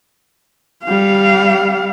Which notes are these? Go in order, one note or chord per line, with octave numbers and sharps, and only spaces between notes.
G3 F5